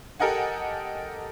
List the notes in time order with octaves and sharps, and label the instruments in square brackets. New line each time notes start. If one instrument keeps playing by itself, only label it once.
[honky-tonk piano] G4 A4 A#4 D#5 F#5 G#5